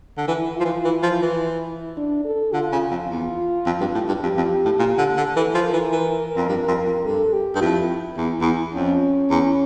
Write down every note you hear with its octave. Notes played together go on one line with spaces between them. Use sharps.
D3
E3 E4
F3 F4
E3
E3 E4
F3
E3
D4
A4
D3 F4
C#3
F2
E2
F2
G2
A2
G2
F2 G4
F2
A2
A#2
D3
D3
E3 A4
F3
A#4
E3
E3
F2
G2
F2
F2
G2 A4
G4
G2
F2 E4
E2
E2
F2 C#4
E2